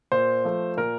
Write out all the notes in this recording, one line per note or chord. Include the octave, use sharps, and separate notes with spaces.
A#2 C5
F3 A3
A#2 A#4